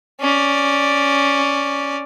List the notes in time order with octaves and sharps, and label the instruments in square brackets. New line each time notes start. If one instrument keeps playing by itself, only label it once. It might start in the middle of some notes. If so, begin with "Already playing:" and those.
[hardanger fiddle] C#4 D5